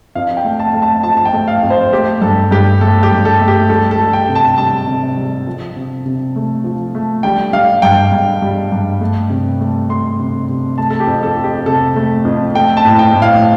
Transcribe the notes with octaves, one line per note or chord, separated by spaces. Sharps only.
F2 F5
G5
A3
A5
A3
A5
F3 A5
A5
G5
A3
F5
F2
C5
A3 G4
G2 A4
G2 G4
A3 A4
G4
G2
A4
A3
G4
G3 A4
A4
G3
G5
C3
A5
G3 A5
C3
G3
F3
C3
C3
A3
F3
A3
G3 G5
G3 F5
G2 G5
G2
G3
G2
A3
C3
A3
A3 C6
C3
C3
A3 A5
A4
G4
F2
A4
F2
G4
C3 A4
A3
F2
A3 G5
A5
A2
G5
A2
F5